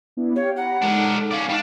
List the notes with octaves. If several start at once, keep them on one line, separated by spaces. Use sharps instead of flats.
B3 D4 E4
G4 C#5 F5 G5
G4 F#5 A#5 B5
G#3 D4 D#4 A4 A#4
C#4 D5 F5
G3 D4 D#4 C#6 F6